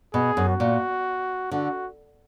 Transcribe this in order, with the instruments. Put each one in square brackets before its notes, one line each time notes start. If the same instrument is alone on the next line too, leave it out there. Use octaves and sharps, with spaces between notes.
[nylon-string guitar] B2 [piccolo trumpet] G#4
[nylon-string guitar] F#2
[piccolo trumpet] F#4
[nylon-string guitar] A#2
[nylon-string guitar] D3 [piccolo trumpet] F#4